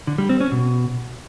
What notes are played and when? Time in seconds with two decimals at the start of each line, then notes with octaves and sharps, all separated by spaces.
0.07 D3
0.18 G3
0.29 C4
0.40 C#4
0.51 B2